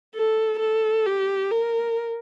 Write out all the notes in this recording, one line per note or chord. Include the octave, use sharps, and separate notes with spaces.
A4
A4
G4
A#4